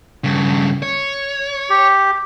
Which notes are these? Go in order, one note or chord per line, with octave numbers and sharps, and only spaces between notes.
G2 C#3
C#5
G4